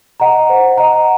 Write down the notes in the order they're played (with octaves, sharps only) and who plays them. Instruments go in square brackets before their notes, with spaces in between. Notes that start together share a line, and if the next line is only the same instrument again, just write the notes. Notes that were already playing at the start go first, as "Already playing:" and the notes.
[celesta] D#5 F#5 A#5
C5
D#5 F#5 A#5